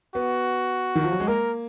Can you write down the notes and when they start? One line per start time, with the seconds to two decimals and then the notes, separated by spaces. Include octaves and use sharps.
0.15 B3 F#4
0.95 D#3
1.03 F3
1.12 F#3
1.20 G#3
1.28 A#3 A#4